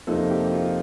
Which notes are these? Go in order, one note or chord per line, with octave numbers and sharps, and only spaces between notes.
F2 C3 F3 A#3 D#4 A4
G4
F4